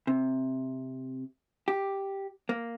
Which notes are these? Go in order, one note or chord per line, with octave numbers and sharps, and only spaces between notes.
C3
G4
A#3